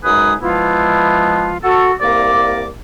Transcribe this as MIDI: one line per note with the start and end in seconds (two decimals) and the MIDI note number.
0.04 0.33 42
0.04 0.33 56
0.04 0.33 63
0.04 0.33 68
0.04 0.33 71
0.04 0.33 87
0.41 1.57 52
0.41 1.57 53
0.41 1.57 56
0.41 1.57 59
0.41 1.57 64
0.41 1.57 65
1.63 1.91 66
1.63 1.91 69
2.01 2.67 36
2.01 2.67 58
2.01 2.67 70
2.01 2.67 74
2.01 2.67 86